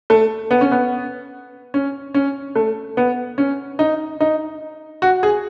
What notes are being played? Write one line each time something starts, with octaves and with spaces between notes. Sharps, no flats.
A3
B3
C#4
B3
C#4
C#4
A3
B3
C#4
D#4
D#4
F#4
G#4